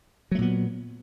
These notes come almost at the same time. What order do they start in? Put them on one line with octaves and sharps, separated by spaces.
F#3 A3 A#2 B3